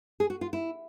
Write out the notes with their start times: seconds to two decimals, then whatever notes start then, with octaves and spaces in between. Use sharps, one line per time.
0.20 G#4
0.30 F#4
0.41 F4
0.53 E4